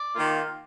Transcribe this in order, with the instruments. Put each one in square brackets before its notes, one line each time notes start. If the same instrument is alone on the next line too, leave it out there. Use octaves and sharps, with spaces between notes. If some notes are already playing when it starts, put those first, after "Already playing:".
Already playing: [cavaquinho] D5
[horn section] D#3 A#3 F4